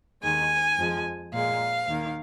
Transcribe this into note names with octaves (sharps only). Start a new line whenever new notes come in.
D#2 D#3 G#3 G#5
F2 F3 G#3
A#2 G#3 F5
D#2 D#3 A#3